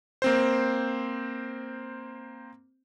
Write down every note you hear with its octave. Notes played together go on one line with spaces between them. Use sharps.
A#3 C4 C5